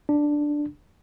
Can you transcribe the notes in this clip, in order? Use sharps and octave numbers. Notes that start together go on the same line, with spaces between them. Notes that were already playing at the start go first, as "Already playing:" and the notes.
D4